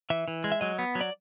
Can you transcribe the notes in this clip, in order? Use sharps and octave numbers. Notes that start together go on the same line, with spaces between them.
E3 E5
E3
G#3
E5
F#3 D#5
B3
F#3
D5